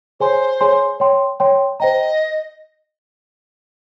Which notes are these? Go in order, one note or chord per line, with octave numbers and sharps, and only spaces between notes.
G#4 C5 C#5 G#5 C6
G#4 C#5 G#5 C6
C#5 G5 C6
C#5 G5 C6
C5 D#5 G5 A#5